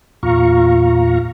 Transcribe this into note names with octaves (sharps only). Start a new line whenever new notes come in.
E2 A#2 F4 F5 A#5 C#6